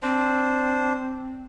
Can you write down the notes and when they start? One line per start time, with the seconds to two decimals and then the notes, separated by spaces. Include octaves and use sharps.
0.03 C4 D4 C5